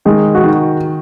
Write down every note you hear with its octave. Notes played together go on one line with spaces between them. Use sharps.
D#3 G#3
F#4
D#3